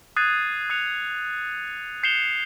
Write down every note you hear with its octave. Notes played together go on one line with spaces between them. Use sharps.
D#6 F#6 G#6 A6 C7 D#7
D#6 F#6 C#7 F7
G6 C7 C#7 E7 F7 G7